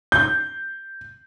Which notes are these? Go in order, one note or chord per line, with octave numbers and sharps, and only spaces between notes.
G6